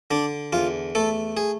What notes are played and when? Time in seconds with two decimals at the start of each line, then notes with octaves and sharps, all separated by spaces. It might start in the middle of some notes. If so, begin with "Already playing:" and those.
0.11 D3 D4
0.53 E2 F4
0.95 A3 A4
1.37 G#4